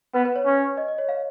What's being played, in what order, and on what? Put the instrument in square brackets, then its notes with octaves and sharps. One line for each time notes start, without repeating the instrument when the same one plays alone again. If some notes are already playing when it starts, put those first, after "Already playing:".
[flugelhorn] B3 [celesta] B4
[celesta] B4
C#5
[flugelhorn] C#4
[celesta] D#5
D#5
C#5
F5